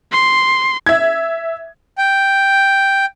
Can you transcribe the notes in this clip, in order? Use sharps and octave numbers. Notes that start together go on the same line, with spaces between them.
C6
E5 G#6
G5